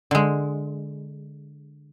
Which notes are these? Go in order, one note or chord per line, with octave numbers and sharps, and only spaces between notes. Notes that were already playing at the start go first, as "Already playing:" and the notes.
D3 G#3